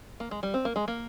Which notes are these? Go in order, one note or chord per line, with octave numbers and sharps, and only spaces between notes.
A#3
G#3
G3
C4
A#3
G#3
A#3